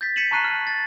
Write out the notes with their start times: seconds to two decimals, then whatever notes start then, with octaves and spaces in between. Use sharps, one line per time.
0.01 G6 A6 B6
0.16 G#6 B6 C#7 D#7 E7 F#7
0.31 A5 A#5 C#6 F#6 C7 D#7
0.44 F6 D#7
0.67 A6